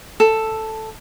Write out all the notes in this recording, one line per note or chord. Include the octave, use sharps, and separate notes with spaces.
A4